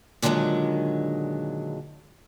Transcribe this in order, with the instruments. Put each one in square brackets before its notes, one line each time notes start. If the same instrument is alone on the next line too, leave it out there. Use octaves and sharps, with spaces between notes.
[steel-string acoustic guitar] A#2 D3 D#3 F#3 G#3